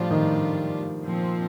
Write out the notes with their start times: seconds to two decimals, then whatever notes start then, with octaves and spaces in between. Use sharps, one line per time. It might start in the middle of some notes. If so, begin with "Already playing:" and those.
Already playing: A2 F3 G3 D4 F4
0.11 D#3
1.04 A#2 F3 C4